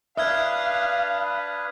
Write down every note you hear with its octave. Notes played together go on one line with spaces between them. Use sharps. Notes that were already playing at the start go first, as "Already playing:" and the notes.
D4 B4 E5 F5 D#6 F6 G#6